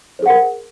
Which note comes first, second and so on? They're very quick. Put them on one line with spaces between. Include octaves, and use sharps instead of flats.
C5 G#4 F#5 A#4